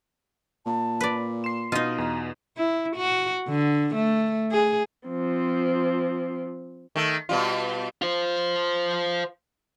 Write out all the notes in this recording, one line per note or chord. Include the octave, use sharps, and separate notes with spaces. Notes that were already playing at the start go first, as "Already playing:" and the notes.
A#2 A5
B4 D5
C6 C7 E7
B2 D#4 F4 D#5 D#7
E2 B2 A#5
E4
F#4
D3
A3
G#4
F3 C4
D#3 A3
B2 G3 F4
F4 C5